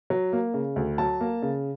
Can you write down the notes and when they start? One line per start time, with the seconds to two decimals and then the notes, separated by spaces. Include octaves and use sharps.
0.10 F#3
0.33 A#3
0.54 C#3
0.76 D2
0.98 F#3 A5
1.21 A#3
1.42 C#3